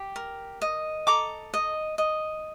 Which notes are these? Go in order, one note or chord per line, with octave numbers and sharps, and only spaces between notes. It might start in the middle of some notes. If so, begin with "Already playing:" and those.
Already playing: G4
A#4
D#5
A4 A#5 D6
D#5
D#5